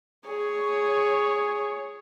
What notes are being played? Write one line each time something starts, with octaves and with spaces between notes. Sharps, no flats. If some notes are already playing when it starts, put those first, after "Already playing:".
G#4 C#5